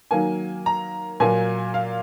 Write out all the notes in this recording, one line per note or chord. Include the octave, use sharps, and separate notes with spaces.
D#3 F#3 A#3 G#5
A#5
A#2 F#3 A#3 G#5
F5